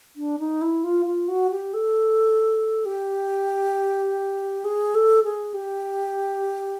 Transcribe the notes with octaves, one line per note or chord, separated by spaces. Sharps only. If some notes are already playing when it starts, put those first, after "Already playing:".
D4
D#4
E4
F4
F4
F#4
G4
A4
G4
G#4
A4
G#4
G4